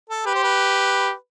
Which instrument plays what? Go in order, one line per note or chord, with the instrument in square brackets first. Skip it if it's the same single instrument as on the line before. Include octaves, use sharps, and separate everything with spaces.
[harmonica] A4
[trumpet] G4 [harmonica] B4
[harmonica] C5
B4